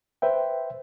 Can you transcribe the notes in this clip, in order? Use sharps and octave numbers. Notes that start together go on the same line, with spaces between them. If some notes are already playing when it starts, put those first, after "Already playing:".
B4 C5 E5 G5